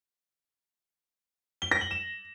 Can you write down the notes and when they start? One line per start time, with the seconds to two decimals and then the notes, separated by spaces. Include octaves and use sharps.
1.62 G7
1.71 A#6
1.81 F#7
1.91 E7